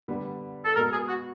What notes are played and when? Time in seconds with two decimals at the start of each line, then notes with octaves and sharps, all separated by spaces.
0.08 D3 G3 B3
0.65 A4
0.76 B2 G#3 B3 A#4
0.92 G#4
1.08 F#4